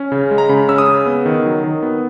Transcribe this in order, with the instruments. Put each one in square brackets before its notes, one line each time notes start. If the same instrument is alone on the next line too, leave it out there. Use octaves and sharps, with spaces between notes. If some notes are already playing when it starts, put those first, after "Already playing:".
Already playing: [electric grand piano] C#4
C#3
G#3
A#5
C#3 B5
C#4 E6
D#6
C#3
B3
D#3
F#3
D#3
B3